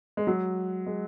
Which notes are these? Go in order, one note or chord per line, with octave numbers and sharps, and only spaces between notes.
G#3
F#3
G#3